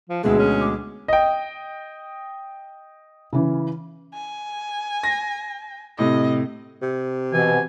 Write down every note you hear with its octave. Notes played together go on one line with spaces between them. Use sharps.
F3
D2 B2 E3 G#3 G#4
C#4
D6
D#5 G5
C#3 E3
G#5
A#6
A2 C3 D#5
C3
B2 E3 G#5